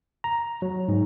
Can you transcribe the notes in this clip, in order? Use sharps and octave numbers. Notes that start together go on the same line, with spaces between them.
A#5
F#3
G#2